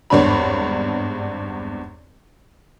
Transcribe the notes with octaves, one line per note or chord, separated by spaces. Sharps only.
G#1 E2 G2 D4 C#5 B5